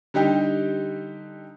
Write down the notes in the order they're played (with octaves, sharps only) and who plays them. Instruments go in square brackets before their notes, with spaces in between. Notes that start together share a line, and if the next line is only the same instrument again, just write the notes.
[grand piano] D3 G3 D#4 G4